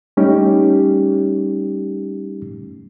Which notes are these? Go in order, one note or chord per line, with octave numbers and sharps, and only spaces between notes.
G3 A3 C#4 D#4 G4